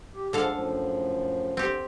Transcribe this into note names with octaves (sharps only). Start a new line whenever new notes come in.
G4
D3 F3 G#3 A4 F5
F#2 A2 F3
D3 C4 G4